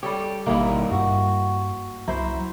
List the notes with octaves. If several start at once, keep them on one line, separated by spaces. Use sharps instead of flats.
G3 G4 A4 C#5
G#1 B2 D#3 G3 A#3 D#4 E4
G2 F#4
C2 F#3 E4 C5 A#5